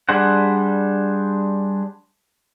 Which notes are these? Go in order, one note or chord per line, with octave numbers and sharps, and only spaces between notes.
G3 D4 G#4 C5 F#5